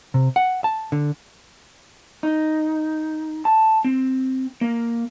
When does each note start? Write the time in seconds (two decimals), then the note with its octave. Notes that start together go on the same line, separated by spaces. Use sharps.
0.14 C3
0.36 F#5
0.64 A5
0.92 D3
2.23 D#4
3.45 A5
3.84 C4
4.61 A#3